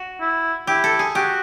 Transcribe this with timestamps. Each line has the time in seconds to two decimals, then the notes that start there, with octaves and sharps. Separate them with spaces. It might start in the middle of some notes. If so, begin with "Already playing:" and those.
Already playing: F#4
0.20 E4
0.67 E4 G4
0.84 A4
0.99 G#4
1.15 F#4 G4